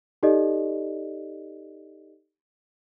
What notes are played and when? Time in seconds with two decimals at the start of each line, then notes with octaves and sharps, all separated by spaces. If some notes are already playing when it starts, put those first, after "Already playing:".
0.23 D#4 G4 A4 D5 D#5